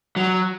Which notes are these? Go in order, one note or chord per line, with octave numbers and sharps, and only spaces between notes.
F#3